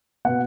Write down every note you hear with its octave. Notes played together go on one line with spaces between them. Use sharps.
B2 B3 F#5